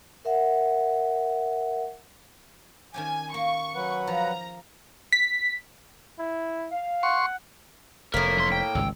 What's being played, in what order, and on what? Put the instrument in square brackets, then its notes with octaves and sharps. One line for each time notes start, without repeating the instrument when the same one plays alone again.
[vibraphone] A#4 E5 F#5
[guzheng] D#3 C#4 G4 [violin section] G#5
[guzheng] A#3 [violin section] C#6
[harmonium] F#3 B4 F#5
[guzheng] F3 [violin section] A#5
[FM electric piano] B6
[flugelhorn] E4
[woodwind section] F5
[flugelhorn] F#5 [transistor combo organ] C6 C#6
[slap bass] F1 [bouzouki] A2 A#3 [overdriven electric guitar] A#4 [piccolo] B6
[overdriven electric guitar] F#2 C6
G5
[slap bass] G#1 C#2 G2 [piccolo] E6